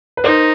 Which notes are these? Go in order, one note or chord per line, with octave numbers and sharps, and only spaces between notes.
B4
D#4 A#4 C5